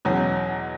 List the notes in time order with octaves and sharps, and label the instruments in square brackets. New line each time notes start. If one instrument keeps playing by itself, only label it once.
[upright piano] E2 B2 F#3 C#4